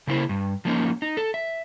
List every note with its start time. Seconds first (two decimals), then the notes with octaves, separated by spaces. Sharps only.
0.07 C#3 A#3 E4 C5
0.29 G2
0.65 F3 A#3 C#4 D#4
1.02 D#4
1.17 A4
1.34 E5